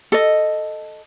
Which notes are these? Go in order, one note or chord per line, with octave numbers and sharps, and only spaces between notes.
A4 D#5